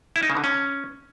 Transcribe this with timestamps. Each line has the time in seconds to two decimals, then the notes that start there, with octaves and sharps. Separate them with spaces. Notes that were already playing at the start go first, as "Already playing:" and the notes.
0.16 E4
0.23 D#4
0.30 C#3
0.37 D3
0.44 C#4